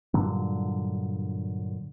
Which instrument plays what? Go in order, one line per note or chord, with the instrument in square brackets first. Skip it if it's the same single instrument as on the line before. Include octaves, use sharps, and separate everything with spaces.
[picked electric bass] G2 A#2 D3 F#3